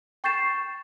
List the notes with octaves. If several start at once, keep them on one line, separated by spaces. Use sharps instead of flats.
G5 C#6 G6 A6 C7 E7